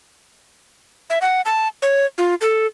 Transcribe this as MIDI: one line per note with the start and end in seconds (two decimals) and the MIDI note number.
1.10 1.19 76
1.21 1.42 78
1.45 1.68 81
1.82 2.06 73
2.18 2.35 65
2.41 2.66 69